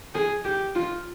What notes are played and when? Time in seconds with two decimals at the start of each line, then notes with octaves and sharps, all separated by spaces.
0.14 G#4
0.45 G4
0.75 F4